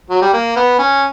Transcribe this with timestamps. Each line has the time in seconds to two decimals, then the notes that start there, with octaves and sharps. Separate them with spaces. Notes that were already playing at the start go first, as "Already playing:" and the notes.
0.10 F#3
0.22 G3
0.33 A#3
0.56 B3
0.79 C#4